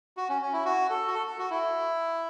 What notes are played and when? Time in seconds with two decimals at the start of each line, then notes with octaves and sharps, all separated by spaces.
0.17 F#4
0.29 C#4
0.42 C#4
0.53 E4
0.65 F#4
0.90 A4
1.08 F#4
1.14 A4
1.27 A4
1.39 F#4
1.50 E4